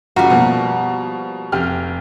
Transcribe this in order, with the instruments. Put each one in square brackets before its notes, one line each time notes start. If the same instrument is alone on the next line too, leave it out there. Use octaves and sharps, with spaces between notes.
[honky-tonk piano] F#1 F4 A#5 [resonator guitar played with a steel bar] G3 F#4
[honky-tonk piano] B2 F3 A#3
F1 G4 F6